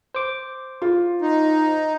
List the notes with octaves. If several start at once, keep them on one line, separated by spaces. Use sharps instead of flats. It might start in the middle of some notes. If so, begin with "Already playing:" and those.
C5 D6
F4
D#4